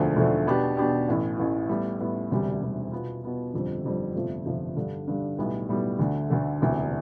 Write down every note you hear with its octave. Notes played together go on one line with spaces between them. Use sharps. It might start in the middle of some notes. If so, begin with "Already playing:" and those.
Already playing: E1 D2 D3 F3 A3
E1 D2 D3 F3 A3
B2 B3 D4 G4
B2 B3 D4 G4
A1 A2 E3
A1 A2 E3
A2 G3 B3
A2 G3 B3
E1 D2 C3 G3
E1 D2 C3 G3
B2 B3 F4
B2 B3 F4
G1 F2 D3 G3 C4
G1 F2 D3 G3 C4
G1 F2 C3 F3 A3
G1 F2 C3 F3 A3
G2 D3 G3
G2 D3 G3
B1 A2 G3 B3
B1 A2 G3 B3
D2 D3 A3
D2 D3 A3
E1 D2 C3 E3